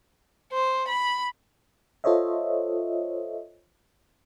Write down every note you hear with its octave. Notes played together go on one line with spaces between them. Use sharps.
C5
B5
F4 A4 C5 C#5 D#5 E5